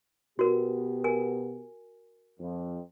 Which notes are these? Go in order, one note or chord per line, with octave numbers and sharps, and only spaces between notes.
B2 B3 F#4 G4 A#4
A#4 G#5
F2